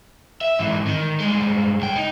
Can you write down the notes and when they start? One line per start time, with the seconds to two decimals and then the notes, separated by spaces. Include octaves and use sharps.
0.41 E5
0.59 G#2 E3
0.88 D#3
1.21 G2 G#3
1.81 C#2 G5
1.96 D#4